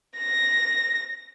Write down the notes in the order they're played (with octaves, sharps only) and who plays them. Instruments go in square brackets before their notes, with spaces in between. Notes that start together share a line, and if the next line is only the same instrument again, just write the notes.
[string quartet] A#6